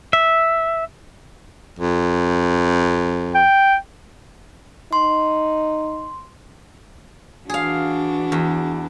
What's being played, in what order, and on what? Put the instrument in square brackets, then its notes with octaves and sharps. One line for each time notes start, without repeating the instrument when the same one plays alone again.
[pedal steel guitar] E5
[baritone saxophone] F2
[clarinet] G5
[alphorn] D#4 [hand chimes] C6
[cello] E3 D4 [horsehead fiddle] F#4 [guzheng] G#4 F5
[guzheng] E2